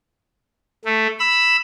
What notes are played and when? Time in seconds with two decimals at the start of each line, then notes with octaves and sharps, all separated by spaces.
0.85 A3
1.19 B5 E6